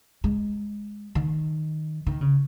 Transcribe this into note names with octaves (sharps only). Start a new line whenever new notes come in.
G#3
D#3
D#3
C#3